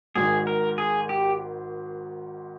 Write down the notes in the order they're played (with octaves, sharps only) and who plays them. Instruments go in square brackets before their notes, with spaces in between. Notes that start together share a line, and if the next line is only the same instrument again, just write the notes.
[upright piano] G#1 G#2 D#3 [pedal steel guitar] G#4
[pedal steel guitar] A#4
G#4
G4